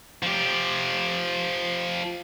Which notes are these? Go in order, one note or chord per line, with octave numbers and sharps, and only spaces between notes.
F3 G4